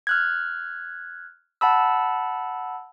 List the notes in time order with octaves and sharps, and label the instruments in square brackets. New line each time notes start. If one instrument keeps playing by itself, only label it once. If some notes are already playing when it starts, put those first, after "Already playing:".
[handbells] F6 F#6 G#6
F#5 A5 B5 E6